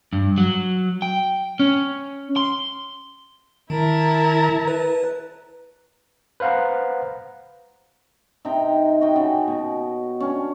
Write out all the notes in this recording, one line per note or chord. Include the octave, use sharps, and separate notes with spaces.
G2
F#3
G5
C#4
C6
D#3 E4 A#4 A5
B4
B4 C5 F5 F#5 A#5
C3 D#4 G5 A#5
F#4 D#5 G5
C#3
B2
C#4 D4